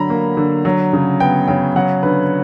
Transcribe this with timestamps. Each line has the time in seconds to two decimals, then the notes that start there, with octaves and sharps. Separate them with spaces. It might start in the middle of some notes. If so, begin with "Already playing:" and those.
Already playing: D3 F#3 A#5 B5
0.10 A#3
0.37 D3
0.65 F#3
0.93 C#3
1.20 B3 G5
1.48 C#3 G5
1.76 F#3 F#5
2.03 D3 B4